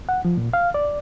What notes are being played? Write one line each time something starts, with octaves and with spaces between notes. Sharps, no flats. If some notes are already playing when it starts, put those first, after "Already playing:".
F#5
F3
A#2
F5
D5